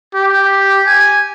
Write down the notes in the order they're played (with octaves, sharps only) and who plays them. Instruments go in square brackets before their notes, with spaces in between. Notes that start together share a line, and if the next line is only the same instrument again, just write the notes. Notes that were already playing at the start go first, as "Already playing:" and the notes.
[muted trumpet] G4
G#5